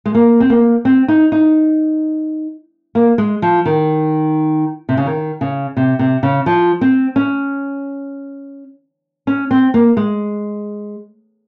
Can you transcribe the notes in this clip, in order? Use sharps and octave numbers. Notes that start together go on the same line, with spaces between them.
G#3
A#3
C4
A#3
C4
D#4
D#4
A#3
G#3
F3
D#3
C3
C#3
D#3
C#3
C3
C3
C#3
F3
C4
C#4
C#4
C4
A#3
G#3